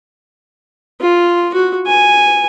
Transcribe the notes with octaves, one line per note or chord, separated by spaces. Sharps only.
F4
F#4
G#5